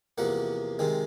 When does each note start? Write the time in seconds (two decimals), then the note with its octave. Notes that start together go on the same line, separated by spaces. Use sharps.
0.18 E2 C3 F3 A#3 F#5
0.79 C3 D#3 G#3 C4